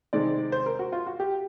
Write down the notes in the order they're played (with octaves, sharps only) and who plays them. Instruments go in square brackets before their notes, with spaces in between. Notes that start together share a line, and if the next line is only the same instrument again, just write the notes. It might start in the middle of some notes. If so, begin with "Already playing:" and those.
[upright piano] C3 D#3 G#3 C4 D5
C5
A#4
F#4
F4
F#4
G4